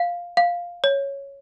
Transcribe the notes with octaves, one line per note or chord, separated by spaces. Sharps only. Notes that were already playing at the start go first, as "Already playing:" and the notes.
Already playing: F5
F5
C#5